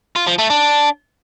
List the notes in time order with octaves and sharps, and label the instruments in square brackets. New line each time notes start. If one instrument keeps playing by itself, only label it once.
[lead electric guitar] F4
F3
A3
D4